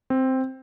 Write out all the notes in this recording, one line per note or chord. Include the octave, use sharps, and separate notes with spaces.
C4